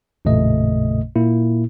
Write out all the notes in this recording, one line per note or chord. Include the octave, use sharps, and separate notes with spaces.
A1 F2 A#2 C#3 A3 D#5
A#2 A#3 E4